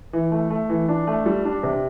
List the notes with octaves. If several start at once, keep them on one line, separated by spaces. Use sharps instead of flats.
E3
A3
A3
E3
D4
A3
G3
D4
C3